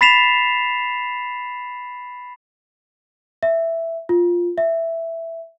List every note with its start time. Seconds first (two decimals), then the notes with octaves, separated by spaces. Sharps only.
0.01 B5 A6 B6 C7 E7 F7
3.43 E5
4.09 F4
4.58 E5